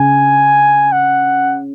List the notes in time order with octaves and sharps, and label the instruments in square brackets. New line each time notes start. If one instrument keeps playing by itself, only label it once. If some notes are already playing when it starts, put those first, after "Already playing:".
Already playing: [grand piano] C#3 [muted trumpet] G#5
[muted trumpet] F#5